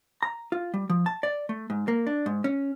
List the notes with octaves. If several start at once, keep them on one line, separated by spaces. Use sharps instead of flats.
A#5
F4
G3
F3
A5
D5
A3
G#2
A#3
D4
G#2
C#4